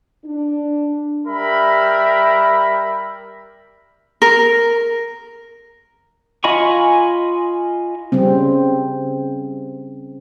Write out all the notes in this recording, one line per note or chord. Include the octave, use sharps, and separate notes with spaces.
D4
G3 A#4 E5 B5
A#4
F4 D#5 G#5 B5 C#6
C#3 G3 C4